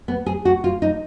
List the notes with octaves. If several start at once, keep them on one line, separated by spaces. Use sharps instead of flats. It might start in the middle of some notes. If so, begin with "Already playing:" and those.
B3
G#4
F#4
F4
D#4